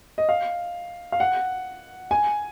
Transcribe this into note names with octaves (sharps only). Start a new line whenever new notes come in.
D#5
F5
F5
F#5
G#5